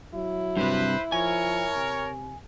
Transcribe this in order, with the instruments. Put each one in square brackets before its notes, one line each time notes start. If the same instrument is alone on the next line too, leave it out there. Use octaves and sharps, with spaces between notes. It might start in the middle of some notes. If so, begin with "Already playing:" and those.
[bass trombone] F#3 [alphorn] E4
[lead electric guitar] G2 C3 [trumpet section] B4 C5
[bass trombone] F3 [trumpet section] A#4 C#5 [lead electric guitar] G#5
[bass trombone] C3